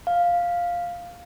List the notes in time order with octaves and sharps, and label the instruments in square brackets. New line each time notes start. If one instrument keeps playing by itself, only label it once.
[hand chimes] F5